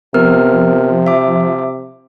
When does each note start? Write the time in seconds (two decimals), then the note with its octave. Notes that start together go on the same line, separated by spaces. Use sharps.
0.14 C3 F3 B3 A#4 F6
1.07 E5 D6